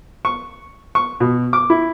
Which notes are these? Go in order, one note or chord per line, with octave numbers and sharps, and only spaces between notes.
C#6
C#6
B2
D6
E4